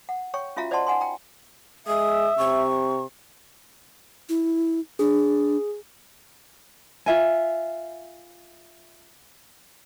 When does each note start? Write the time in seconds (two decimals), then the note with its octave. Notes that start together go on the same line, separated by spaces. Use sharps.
0.09 F#5
0.34 C#5 G5 C#6
0.56 C#4 F4 F#4 E5 F5 A#5
0.71 C5 D5 D#5 F#5 A5 C6
0.87 D#4 F#5 G#5 C6
1.01 G5 A#5
1.87 G#3 E5 D#6
2.38 C3 C#6
4.29 E4
4.99 D4 G#4
7.06 F4 E5 G#5